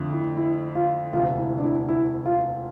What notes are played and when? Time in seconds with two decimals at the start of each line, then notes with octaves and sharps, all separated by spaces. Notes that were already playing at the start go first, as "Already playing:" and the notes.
Already playing: F2 D3 F3 A3
0.13 E4
0.37 E4
0.75 F4
1.13 E1 D2 C3 F4
1.38 E4
1.58 D4
1.64 E4
1.89 E4
2.26 F4